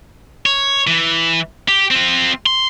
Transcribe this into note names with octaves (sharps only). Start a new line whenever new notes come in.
C#5
E3
G4
C4 F4
C6